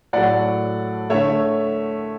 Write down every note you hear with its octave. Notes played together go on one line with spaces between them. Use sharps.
A2 F#3 A3 D5 F#5
D3 A3 C#5 E5